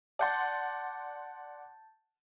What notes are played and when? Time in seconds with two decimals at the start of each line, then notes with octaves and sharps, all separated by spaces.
0.19 D5 F#5 A5 C6 G6 A6